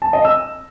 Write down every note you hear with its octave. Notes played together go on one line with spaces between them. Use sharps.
A5
D#5
E6